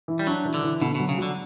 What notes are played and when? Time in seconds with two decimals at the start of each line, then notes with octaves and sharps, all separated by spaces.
0.08 E3
0.19 G3
0.27 F#3 D4
0.45 E3
0.54 D3
0.63 E3
0.81 B2 D3
0.95 B2 F#3
1.09 C#3
1.18 D3 F#3